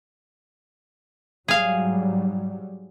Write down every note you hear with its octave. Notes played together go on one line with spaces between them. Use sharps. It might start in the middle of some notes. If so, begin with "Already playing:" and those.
G#2 F#3 G3 G#4 F5